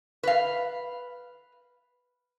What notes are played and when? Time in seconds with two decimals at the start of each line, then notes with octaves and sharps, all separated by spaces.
0.23 B4 F5